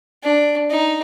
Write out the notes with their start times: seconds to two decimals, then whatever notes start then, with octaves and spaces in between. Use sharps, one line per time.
0.23 D4
0.70 D#4